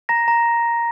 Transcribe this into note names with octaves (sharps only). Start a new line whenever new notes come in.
A#5 A#6
A#5